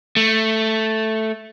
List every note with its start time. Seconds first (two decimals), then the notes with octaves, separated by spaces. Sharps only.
0.17 A3